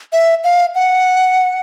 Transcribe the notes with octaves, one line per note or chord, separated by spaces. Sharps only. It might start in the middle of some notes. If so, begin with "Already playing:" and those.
E5
F5
F#5